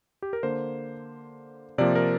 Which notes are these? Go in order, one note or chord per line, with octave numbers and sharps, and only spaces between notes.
G4
A#4
D3 A#3 C5
C3 F3 A#3 D5
A#4